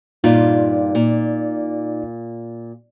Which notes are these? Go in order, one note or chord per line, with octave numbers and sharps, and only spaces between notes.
G2 A#2 D#4 F4 D5
A#2